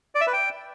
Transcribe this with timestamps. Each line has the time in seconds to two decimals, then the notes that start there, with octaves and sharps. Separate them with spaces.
0.15 D5
0.21 E5
0.27 B4
0.33 G5